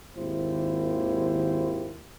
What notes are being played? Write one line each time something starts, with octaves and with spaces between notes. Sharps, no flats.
G#1 D#2 A#3 E4 G4 C5